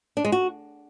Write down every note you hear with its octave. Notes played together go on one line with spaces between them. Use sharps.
D4
G#3
F#4